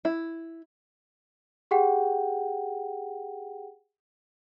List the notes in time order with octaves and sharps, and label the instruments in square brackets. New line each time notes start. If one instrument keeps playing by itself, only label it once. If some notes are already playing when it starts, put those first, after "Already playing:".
[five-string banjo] E4
[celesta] G4 G#4 F#5 G5